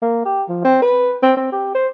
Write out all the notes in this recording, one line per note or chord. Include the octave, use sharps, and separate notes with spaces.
A#3
G4
F3
C4
B4
C4
C4
G4
C5